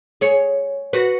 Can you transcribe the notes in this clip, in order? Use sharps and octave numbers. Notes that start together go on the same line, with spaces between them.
G#4 C#5
F#4 B4